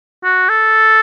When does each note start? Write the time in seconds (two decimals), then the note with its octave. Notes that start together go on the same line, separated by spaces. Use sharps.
0.24 F#4
0.49 A4